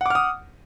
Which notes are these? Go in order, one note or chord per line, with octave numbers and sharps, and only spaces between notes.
F#5 D6 D#6 F6